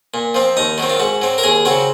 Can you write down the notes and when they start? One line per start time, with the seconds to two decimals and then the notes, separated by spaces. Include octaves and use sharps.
0.14 A#2
0.35 F3 C4
0.57 D#2 D#4
0.78 D#3 F#3 C4
0.90 F4
1.00 G#2 F#4
1.22 F#3 C4
1.38 A#4
1.43 D#2 G#4
1.65 C#3 F#3 C4 F#4